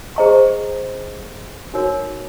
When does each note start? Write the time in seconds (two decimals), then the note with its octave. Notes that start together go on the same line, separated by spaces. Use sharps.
0.16 G#4 C5 D#5 A#5 C#6
1.74 D#4 F#4 A#4 C#5